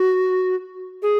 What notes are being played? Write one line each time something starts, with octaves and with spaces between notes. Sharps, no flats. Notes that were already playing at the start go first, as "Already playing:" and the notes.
Already playing: F#4
G#4